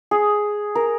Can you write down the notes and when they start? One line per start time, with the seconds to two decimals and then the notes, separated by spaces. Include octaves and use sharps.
0.11 G#4
0.75 A#4